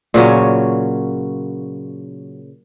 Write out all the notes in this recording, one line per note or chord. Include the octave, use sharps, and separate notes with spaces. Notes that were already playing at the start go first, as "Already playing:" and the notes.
A#2 C#3 F#3 C#4